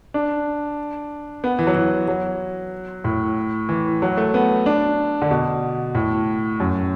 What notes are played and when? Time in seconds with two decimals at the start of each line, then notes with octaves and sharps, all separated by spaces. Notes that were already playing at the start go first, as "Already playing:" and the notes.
0.14 D4
1.44 B3
1.59 E3
1.67 F#3
1.75 E3
2.08 F#3
3.04 A2
3.69 E3
4.02 F#3
4.17 A3
4.34 B3
4.66 D4
5.22 D3
5.31 B2
5.95 A2
6.60 F#2